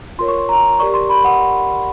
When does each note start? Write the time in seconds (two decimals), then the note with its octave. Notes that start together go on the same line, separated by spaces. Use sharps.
0.19 F4 A#4 C#5 C6
0.28 C#6
0.38 C6
0.49 A#5
0.79 G4 A#4 D5 C#6
0.94 C6
1.09 B5
1.24 F#5